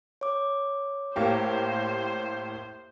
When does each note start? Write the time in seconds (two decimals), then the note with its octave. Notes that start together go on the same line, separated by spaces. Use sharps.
0.21 C#5 D6
1.16 A2 A#3 G4 C5